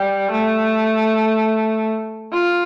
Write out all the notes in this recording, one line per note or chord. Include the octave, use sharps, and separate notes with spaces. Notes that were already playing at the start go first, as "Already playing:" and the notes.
Already playing: G3
A3
F4